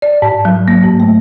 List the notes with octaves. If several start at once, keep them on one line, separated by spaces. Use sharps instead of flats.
D5
G#2
F#3
A#3
G#2
A3